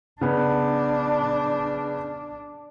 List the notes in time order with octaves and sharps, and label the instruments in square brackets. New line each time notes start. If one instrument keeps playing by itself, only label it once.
[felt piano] C#3 B3 [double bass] D4